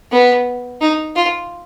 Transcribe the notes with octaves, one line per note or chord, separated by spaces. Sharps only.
B3
D#4
F4